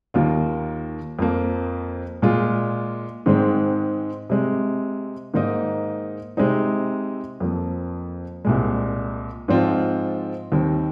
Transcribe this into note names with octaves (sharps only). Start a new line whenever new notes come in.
D#2 D#3 A#3 F4
F2 F3 A#3
A#2 G#3 F4
G#2 D#3 G#3 C4
C3 G#3 C4
G#2 D#3 A#3 D#4
C3 G#3 C4 D#4
F2 F3 A#3
C2 A#2 G#3
G#2 F3 C4 F4
D#2 D#3 C4